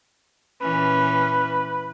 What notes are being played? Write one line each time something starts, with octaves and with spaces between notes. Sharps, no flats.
A#2 E3 C#4 B4